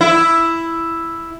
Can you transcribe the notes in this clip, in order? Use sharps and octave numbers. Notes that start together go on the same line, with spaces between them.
E4